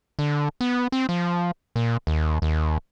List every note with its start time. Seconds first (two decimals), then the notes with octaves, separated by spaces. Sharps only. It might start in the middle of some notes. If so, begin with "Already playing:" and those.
0.19 D3
0.61 B3
0.92 C4
1.09 F3
1.76 A#2
2.07 D#2
2.42 D#2